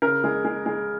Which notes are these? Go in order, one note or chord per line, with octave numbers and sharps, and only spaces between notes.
C#3 A#4
G#3
G#3
G#3